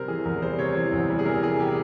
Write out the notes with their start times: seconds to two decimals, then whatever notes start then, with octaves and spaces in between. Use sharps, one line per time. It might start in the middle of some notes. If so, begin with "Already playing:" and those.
Already playing: C3 G3 A#4 C5
0.08 E3 G#4
0.25 E2 A#4
0.42 G3 C5
0.59 C3 C#5
0.75 E3 C5
0.93 E2
1.10 G3
1.19 G#4
1.26 C3 A#4
1.43 E3 G#4
1.60 G4